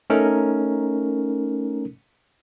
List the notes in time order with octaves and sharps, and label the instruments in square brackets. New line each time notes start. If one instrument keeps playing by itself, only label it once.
[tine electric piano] A3 C#4 D#4 A4 A#4